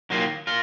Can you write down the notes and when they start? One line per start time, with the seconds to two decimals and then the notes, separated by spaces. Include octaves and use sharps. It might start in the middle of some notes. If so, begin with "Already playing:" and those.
0.10 D#3 F#3 A#3 F4
0.47 F4 A#4